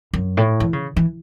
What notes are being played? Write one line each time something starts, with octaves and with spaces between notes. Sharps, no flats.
F#2
A2
E3
C#3
E3